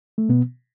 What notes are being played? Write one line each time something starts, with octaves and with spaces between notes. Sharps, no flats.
A3
B2 B3